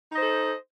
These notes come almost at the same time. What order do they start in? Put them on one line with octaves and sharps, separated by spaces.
D#4 D#5 C5 A4